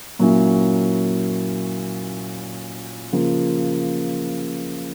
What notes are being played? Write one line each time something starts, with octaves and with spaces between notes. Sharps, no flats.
A#2 F#3 A#3 C#4 E4
C#3 F3 A#3